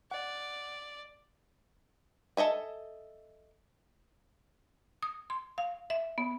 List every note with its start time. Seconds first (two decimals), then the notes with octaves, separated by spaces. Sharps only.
0.11 D5 F#5
2.37 A4 D#5 E5 G#5
5.03 D#6
5.30 C6
5.58 F5
5.90 E5
6.18 B3